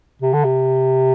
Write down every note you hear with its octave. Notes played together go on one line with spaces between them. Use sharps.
C3
D3
C3